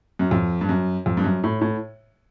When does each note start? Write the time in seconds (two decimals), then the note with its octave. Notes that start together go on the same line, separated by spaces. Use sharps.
0.19 F#2
0.31 F2
0.61 G2
0.69 F#2
1.06 F2
1.17 G2
1.24 F#2
1.44 A2
1.61 A2